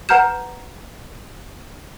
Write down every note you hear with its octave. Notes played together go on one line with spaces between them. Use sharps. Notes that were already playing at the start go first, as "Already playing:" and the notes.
B4 F#5 A#5 F6 G6 E7